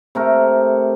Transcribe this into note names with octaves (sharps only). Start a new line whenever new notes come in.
C3 A3 A#4